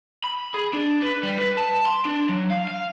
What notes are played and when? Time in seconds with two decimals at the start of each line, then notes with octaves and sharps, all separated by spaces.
0.24 B5
0.54 G#4
0.73 D4
1.02 B4
1.23 G3
1.39 B4
1.57 A5
1.86 C6
2.05 D4
2.29 F#3
2.50 F5
2.67 F5